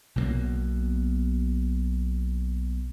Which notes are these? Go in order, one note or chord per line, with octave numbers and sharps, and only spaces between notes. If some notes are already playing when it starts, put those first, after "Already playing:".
B1 B2 E3 A#3